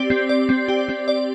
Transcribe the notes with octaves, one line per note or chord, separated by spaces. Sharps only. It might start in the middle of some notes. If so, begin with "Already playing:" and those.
Already playing: C4 G4 D5
C4
D5
C4
G4
C4
D5